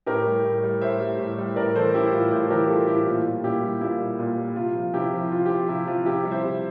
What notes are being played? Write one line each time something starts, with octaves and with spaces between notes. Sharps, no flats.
A2 G4 A#4
G3
A2
G3
A2 C5 E5
G3
A2
G3
A2 A#4 D5
E3 A4 C5
G3 E4 G4
A2 F4
A2 E4 G4
E3 G4 A#4
G3 F4 A4
A2 E4 G4
A#2 F4
G3
A#2 E4 G4
G3
A#2 E4 G4
G3
A#2
G3
C3 F4
F3
C3 E4 G4
F3
C3 F4
G4
F3 F4
C3 E4
F3 F4
C3 E4 G4
G3
C5 E5
C3